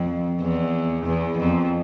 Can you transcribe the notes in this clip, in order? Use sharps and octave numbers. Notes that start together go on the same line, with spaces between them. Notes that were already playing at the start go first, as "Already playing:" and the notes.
Already playing: F2
E2
E2
F2